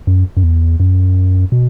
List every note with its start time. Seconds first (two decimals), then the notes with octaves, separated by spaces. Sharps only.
0.07 F#2
0.37 F#2
0.43 E2
0.80 F#2
1.52 B2